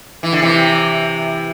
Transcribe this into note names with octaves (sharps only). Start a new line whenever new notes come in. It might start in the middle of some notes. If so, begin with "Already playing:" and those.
E3
D3
C3 E3